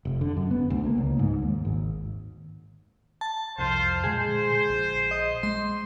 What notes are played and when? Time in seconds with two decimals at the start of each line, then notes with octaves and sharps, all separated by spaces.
0.05 F1
0.21 D3
0.37 F#2
0.51 B3
0.70 D2
0.87 A#3
0.98 C#2
1.19 G#2
1.42 D#2
1.65 G#1
3.21 A5
3.58 C2 F2 F4 C5
4.04 A#2 D3 G#3 G#4 C5
4.69 A#1
5.11 D#5
5.43 G#3 C6